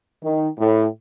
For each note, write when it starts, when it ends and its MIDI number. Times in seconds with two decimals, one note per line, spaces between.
0.22 0.48 51
0.59 0.85 45